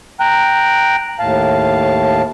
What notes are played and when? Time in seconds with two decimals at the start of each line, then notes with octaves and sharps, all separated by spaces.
0.20 G5 A#5 F#6
1.20 D#2 A2 F5 A5